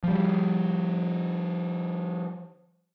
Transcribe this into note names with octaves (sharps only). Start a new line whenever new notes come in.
F3 G3